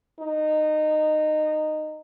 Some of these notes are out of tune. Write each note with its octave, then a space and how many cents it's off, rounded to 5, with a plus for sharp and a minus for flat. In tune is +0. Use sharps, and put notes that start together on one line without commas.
D#4 -15